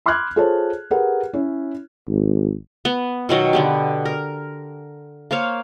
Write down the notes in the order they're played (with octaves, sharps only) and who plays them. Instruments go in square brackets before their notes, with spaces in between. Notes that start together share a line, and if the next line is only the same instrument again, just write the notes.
[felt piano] B5 C6 D6 F6 F#6 G#6
F4 G#4 A4 C5 C#5 A5
G4 G#4 A#4 B4 F#5
C#4 E4 C#5
[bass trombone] G#1
[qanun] B3
B2 D#3 F#3 G5
D3 B3 G4
A#4
A#3 C5 C#5 F5